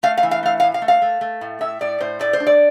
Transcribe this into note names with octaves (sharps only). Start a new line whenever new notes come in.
A3 F5
F5
E3
F5
A3 F5
F5
A2
F5
A3
F5
A3
A3
A2
A2 E5
A2 D5
A2 C5
A3 D5
C5
D4
D5